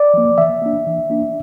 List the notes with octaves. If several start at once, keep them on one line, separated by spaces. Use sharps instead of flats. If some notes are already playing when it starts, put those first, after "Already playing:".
Already playing: D5
F3 A#3
E3 E5
A#3 D4
E3
A#3 D4